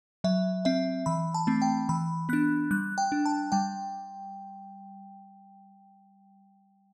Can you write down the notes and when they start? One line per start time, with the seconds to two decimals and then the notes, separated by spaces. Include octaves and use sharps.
0.24 F#3 E5
0.65 C4 E5
1.06 E3 B5
1.34 A5
1.47 A3 C4
1.62 G5
1.89 E3 B5
2.29 B3 D4 F#6
2.71 G3 F#6
2.98 G5
3.12 D4
3.26 A5
3.52 G3 G5